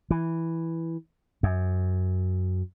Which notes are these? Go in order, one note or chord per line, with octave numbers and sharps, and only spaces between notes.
E3
F#2